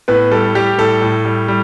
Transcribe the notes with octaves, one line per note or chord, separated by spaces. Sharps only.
A2 B3 B4
G3 A4
G3 G4
A2 A4
A2
G3
G3